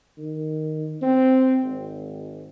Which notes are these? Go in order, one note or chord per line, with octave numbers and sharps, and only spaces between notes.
D#3
C4
G#1